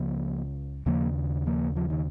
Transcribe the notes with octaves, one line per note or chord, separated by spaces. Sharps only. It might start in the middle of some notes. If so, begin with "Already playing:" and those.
Already playing: C#2 C#3 F3 A#3
D#2 C#3 F3 A#3
F3 A#3
F3
D#3